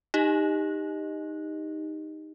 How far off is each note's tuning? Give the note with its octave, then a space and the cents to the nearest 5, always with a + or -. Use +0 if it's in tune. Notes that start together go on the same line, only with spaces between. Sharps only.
D#4 +0 G4 +20 D#5 -5